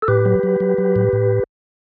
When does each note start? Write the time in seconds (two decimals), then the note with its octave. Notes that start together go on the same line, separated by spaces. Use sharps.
0.02 A4
0.08 A2 G4 B4
0.26 F#3
0.43 F#3
0.60 F#3
0.78 F#3
0.96 A2
1.13 A2